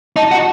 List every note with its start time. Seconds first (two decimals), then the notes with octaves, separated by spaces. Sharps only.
0.16 D#4 A5
0.31 F#4